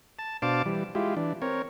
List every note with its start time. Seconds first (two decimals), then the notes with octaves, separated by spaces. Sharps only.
0.19 A5
0.42 B2 D4 C5 F5 A5 D6
0.65 E3 G3
0.95 G#3 E4 F4 G4
1.17 E3 D4
1.42 C4 A#4 C#5